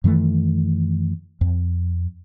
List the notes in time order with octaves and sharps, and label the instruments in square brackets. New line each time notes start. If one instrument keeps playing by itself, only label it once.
[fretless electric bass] F#2 D#3 E3 A3
F2